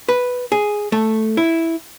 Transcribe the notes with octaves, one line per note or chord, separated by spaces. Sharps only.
B4
G#4
A3
E4